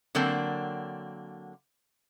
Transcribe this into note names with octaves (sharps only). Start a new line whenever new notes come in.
D3 F#3 A#3 C4 D4